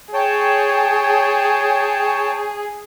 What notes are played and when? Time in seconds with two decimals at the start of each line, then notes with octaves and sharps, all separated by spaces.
0.14 G#4 C#5 G5 A5